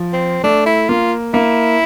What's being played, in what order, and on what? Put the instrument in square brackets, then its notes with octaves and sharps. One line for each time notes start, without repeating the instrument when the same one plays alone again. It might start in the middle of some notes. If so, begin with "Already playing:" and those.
Already playing: [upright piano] F3
[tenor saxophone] C4
[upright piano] A3 [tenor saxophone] D4
[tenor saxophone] E4
[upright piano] A#3 [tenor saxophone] F4
[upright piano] A#3 [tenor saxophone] E4